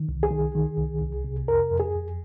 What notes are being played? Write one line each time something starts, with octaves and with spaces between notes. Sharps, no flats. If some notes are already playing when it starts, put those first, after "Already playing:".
Already playing: D#3
C2
G#4
D#3
D#3
C2
C2
C3
F2 A#4
F2
G#4
F2